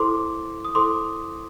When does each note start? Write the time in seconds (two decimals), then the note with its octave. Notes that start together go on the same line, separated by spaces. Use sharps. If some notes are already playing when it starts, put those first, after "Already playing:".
Already playing: E4 A4 C5 C6 D6
0.65 D#6
0.75 E4 A4 C5 C6 D6